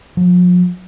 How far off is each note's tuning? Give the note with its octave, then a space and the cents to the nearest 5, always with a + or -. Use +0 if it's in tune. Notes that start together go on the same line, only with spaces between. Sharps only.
F3 +40